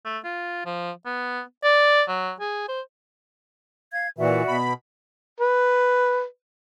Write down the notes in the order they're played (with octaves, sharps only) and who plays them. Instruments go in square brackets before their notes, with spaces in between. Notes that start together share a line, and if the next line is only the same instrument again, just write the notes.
[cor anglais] A3
F4
F3
B3
D5
F#3
G#4
C5
[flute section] F5 G#6
[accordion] A#2 E3 [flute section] F#4 D5 E5
[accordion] B2 B5
[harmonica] B4